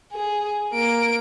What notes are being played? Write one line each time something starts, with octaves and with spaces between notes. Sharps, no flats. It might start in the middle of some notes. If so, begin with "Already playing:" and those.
G#4
A#3 D7